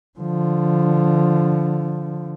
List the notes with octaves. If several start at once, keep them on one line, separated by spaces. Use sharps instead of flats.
D3 F3